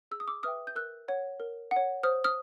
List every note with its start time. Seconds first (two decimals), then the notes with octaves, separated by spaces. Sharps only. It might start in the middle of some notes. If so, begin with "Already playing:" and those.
0.11 G#4 E6
0.20 D#6
0.28 D6 E6
0.43 B4 E5 G5 D#6 F6
0.67 G6
0.76 A#4 E6 F#6
1.08 C#5 F#5
1.40 A#4
1.71 F#5
1.76 C#5
2.03 C5 D#6 F6
2.24 D#6 F6